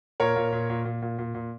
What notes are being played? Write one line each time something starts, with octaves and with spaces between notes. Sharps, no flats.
A#2 A#4 C#5
A#2
A#2
A#2
A#2
A#2
A#2
A#2